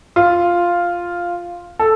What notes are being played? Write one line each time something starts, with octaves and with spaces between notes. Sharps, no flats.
F4
A4